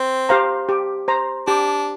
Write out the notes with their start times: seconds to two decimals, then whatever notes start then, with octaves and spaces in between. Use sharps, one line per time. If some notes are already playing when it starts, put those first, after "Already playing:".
Already playing: C4
0.29 G4 C5 F5 A#5
0.69 G4
1.08 C5 A#5
1.47 D4 G4